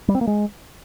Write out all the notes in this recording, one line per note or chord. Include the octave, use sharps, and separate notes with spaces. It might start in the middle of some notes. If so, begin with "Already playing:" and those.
G3
C4
A#3
G#3